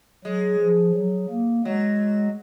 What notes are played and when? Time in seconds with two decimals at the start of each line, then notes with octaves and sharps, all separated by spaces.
0.25 F#3 G#3
0.60 F3
0.95 F#3
1.30 A#3
1.65 F#3 G#3